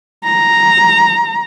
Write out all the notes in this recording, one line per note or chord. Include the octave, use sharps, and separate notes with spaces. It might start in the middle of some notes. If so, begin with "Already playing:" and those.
A#5